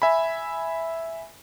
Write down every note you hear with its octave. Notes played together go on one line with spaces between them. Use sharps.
E5 G#5 B5